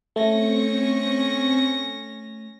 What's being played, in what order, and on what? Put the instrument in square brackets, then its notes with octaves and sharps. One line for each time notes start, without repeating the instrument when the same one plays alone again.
[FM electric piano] A3 [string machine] C4 C#6 [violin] C#4 A#6